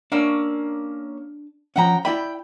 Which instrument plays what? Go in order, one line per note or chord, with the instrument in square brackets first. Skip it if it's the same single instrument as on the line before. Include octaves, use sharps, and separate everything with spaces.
[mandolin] A#3 C#4 E6 [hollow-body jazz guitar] D4
[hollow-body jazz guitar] F3 C#4 [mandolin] F#5 G5 A#5
[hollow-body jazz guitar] E4 D5 B5 [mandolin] G5